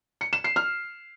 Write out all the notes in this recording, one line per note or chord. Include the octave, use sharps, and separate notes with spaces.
C#7
E7
C7
F6